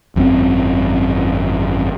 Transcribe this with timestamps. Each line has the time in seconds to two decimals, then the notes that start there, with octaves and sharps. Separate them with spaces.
0.16 G#1 F#2 D3 C4